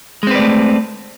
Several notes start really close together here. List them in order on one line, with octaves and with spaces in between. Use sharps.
G#3 C4 B4 D5 A3